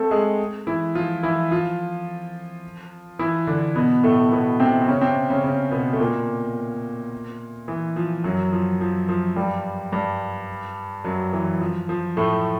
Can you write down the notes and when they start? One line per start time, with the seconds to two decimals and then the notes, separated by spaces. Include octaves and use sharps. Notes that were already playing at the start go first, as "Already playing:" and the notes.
Already playing: A3 C4 A4
0.11 G#3 G#4
0.67 E3 E4
0.95 F3 F4
1.23 E3 E4
1.51 F3 F4
3.19 E3 E4
3.47 D3 D4
3.76 B2 B3
4.03 A2 A3
4.32 B2 B3
4.60 C3 C4
4.82 C4
4.88 C#3 C#4
5.01 C3 C4
5.30 C#3 C#4
5.44 C#3 C#4
5.71 B2 B3
5.93 A3
6.00 A#2 A#3
7.68 E3
7.96 F3
8.24 F#2 F#3
8.52 F3
8.81 F3
9.09 F3
9.36 G2 G3
9.93 G2 G3
11.04 F#2 F#3
11.33 E3
11.61 F3
11.89 F3
12.17 A2 A3